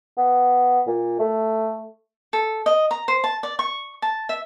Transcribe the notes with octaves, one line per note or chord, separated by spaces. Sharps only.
B3
A#2
A3
A4
D#5
A#5
C5
A5
D5
C#6
A5
E5